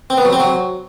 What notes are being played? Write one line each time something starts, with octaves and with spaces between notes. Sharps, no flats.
C4
B3
F#3
C4
F#3